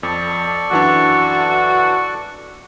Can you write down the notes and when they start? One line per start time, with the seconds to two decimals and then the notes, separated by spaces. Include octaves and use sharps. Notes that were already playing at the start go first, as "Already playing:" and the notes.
0.03 F2 A4 D5 C#6
0.71 F#2 E3 D4 F#4